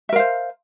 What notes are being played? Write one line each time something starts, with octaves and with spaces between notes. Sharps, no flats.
A#4 C5 E5 F5